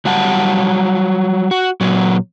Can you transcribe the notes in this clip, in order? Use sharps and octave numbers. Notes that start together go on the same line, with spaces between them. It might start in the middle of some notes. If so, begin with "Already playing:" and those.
F#3 G3 F#5 A5
F#4
A#2 F#3